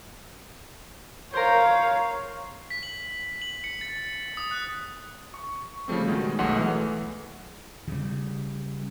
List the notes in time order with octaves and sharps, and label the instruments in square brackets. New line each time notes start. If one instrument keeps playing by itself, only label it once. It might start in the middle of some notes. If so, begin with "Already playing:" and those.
[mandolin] A#4 C5 [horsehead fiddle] C#5 F5
[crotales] B6
F#7
F#7
C#7
A6
D#6
F#6
[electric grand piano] C#6
C#3 F3 G3 A3 C4
B2 D#3 G#3 G#4
B1 A3 G#4 F#5
E3 A3
[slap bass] C#3 G3